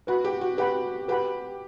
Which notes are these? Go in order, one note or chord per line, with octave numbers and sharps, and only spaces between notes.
F#4 B4 F#5 B5
G4
F#4
G4 B4 F#5 B5
G4 B4 F#5 B5